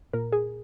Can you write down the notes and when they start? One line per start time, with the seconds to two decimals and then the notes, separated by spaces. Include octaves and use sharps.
0.13 A#2 A#4
0.32 G#4